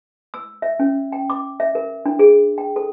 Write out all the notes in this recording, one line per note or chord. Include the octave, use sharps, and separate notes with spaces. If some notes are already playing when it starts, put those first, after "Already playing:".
E6
E5
C#4
G5
D6
E5
A#4
D4
G#4
G5
A4